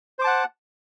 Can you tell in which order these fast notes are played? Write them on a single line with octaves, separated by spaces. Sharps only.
C5 D6 A5 F#5